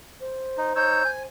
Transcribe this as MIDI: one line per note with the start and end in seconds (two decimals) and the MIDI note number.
0.20 1.26 72
0.57 0.73 63
0.76 1.03 63
0.76 1.03 73
0.76 1.03 88
0.76 1.10 91
1.05 1.23 80